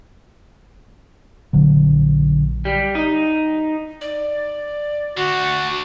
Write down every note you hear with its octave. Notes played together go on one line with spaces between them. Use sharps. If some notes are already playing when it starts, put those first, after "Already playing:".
A#1 D3 F#3
G3
D#4
D5
D3 A3 F#4